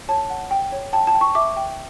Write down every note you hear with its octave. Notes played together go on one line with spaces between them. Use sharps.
C#5 A5
F#5
G5
C#5
G5 A5
A5
G5
C#6
E5 D6
G5